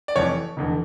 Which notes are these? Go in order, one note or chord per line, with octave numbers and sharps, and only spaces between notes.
D5
F1 F2 E3 C#5
F1 E2 D3